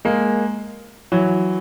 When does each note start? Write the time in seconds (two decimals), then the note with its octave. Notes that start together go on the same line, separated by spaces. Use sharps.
0.05 G#3 A#3
1.12 E3 F#3